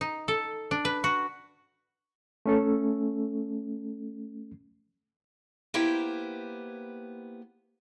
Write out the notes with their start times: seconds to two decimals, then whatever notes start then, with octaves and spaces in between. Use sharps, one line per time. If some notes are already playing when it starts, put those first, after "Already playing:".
0.01 D#4
0.28 A4
0.71 D4
0.85 B4
1.04 F#4
2.46 A3 C#4 A4
5.74 A#3 B3 E4 G4 C5 G5